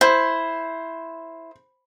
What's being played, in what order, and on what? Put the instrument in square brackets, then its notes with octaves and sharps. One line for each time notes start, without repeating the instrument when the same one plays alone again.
[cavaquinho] E4 [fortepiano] C5